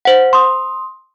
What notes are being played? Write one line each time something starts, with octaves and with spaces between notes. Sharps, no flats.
C5 F#5
C6 D#6